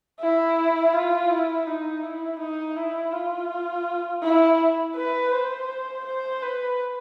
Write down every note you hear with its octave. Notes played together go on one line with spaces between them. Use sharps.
E4
F4
E4
D#4
E4
D#4
E4
F4
E4
B4
C5
C5
B4